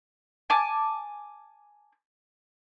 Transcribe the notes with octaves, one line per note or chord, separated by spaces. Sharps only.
G#5 A5 D6